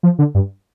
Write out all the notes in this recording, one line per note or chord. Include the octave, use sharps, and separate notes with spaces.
F3
D3
G2